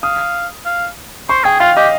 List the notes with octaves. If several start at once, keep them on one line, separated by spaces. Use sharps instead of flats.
F5 D#6
F5
C5 C#6
G#4 G5
F4 F5
G4 D#5